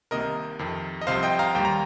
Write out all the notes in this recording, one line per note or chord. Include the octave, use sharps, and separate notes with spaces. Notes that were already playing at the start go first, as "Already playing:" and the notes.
C2 C3 D#3 A#3 A#4 D#5
F2 C3 D#3
D#5
C2 C3 F3 C5 F5
D#5 G5
F5 A#5
D#2 D#3 G3 A#3 G5
A#5